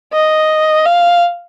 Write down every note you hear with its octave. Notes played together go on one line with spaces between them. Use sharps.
D#5
F5